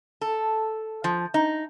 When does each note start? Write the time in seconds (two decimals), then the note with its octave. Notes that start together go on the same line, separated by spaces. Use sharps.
0.21 A4
1.04 F3
1.34 D#4